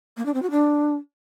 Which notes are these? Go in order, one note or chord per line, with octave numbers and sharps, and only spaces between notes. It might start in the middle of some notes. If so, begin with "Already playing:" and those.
A#3
D4
C4
F#4
D4